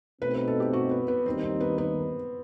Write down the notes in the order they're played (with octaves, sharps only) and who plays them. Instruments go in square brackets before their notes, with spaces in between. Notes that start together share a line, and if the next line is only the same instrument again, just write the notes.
[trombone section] B2 A3 C4 D#4 [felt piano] B4
[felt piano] B4
A4
G4
F#4
B3
B3
[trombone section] D#2 D#3 G3 D#4 [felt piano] C4
[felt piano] C4
B3
B3